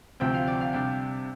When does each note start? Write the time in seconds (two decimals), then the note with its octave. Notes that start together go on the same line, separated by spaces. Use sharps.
0.20 D2 C3 F3 C4 G5
0.34 F5
0.47 D5
0.61 F5
0.73 C3 G3 D4 G5